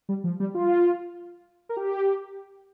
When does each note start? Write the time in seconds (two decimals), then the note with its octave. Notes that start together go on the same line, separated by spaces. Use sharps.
0.09 G3
0.24 F3
0.40 G3
0.55 F4
1.69 A#4
1.77 G4